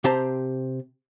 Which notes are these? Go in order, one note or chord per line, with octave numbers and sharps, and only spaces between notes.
C3 C4 G4 C5 A5 A#5